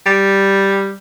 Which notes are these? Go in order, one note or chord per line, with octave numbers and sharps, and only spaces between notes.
G3